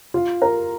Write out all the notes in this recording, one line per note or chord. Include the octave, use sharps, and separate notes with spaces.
F4
A#4